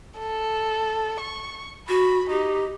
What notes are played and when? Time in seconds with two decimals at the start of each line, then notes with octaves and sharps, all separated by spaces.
0.19 A4
1.20 C#6
1.89 F#4 B5
2.30 D#4 G4